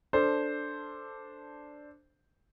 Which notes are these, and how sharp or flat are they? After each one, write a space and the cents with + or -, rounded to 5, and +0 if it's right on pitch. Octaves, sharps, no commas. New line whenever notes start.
D4 +0 A4 +5 C5 +0